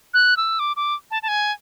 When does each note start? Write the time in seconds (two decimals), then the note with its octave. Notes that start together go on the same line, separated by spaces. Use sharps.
0.14 F#6
0.37 E6
0.59 D6
0.76 D6
1.11 A5
1.23 A5
1.28 G#5